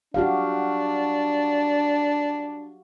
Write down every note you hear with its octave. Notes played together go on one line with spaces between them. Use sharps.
D4 F#4 G4 F5